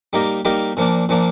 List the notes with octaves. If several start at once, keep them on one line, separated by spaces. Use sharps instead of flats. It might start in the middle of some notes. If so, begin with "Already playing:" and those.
G3 A#3 D#4 G4 A#4
G3 A#3 D#4 G4 A#4
A#2 F3 A#3 D4
A#2 F3 A#3 D4